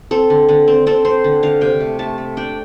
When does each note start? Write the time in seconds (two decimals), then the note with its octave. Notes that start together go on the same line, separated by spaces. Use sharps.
0.11 C4 A4
0.30 D3
0.49 D3
0.68 C4
0.87 C4 A4
1.05 C4 C5
1.24 D3
1.43 D3 F5
1.61 C3 G5
1.80 A3
1.99 A3 A5
2.18 A3
2.37 D4 G5